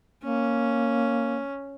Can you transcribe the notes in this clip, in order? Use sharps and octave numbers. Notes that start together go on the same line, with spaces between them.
A#3 C#4